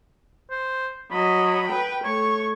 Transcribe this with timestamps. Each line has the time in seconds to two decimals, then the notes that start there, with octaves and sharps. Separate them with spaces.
0.51 C5
1.11 F#3 D#5 B5
1.68 B4 G5
2.04 A3 C#5 C#6